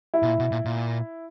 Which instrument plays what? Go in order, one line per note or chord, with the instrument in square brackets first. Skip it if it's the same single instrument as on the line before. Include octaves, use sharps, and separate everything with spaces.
[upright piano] E4
[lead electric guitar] B2
A#2
B2
A#2
A#2